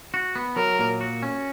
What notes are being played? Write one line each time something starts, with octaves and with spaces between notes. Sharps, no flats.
F#4
B3
F#3 A#4
A#2
F#4
C#4